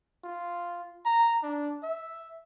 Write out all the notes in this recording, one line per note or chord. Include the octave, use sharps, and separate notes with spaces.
F4
A#5
D4
E5